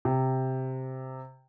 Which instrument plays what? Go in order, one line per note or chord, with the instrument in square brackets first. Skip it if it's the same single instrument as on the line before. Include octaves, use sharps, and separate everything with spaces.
[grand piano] C3